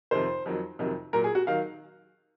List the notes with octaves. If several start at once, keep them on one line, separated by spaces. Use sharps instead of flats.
F2 C3 D#3 C5
F2 D#3 F#3
F2 C3 D#3 F#3
A#2 F#3 A#4
G#4
F#4
D#3 F#3 F5